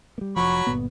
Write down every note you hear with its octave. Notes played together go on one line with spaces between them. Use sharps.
G3 A#3
F1 F3 F#3 B5 C#6
G1 A#2 B3